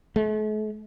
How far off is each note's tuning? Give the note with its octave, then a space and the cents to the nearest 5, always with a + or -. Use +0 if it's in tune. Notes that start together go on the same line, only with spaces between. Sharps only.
A3 -45